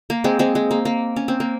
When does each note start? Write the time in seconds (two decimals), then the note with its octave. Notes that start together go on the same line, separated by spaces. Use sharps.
0.10 A#3
0.24 G#3 C4
0.39 G#3 C4
0.55 G#3
0.71 A#3
0.85 A#3
1.16 C#4
1.28 C4
1.40 A#3